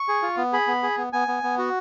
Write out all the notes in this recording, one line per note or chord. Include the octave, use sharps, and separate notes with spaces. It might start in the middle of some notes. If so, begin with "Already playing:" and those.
Already playing: C#6
G#4
F4
B3
G#4 B5
B3
G#4
B3
B3 G#5
B3
B3
F#4